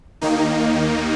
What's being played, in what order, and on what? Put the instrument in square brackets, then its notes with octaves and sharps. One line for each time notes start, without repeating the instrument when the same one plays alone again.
[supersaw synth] D#2 D#3 A#3 D#4